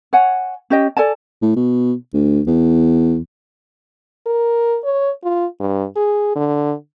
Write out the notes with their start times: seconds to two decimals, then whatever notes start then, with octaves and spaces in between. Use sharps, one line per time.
0.13 C#5 F#5 G#5
0.70 C#4 G4 D#5 G5
0.97 A4 D5 G#5 A5
1.42 A2
1.56 B2
2.14 D2
2.47 E2
4.26 A#4
4.84 C#5
5.24 F4
5.60 G2
5.96 G#4
6.36 D3